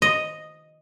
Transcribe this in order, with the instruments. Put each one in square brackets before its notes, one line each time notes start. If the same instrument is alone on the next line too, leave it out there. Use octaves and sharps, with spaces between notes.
[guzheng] D#5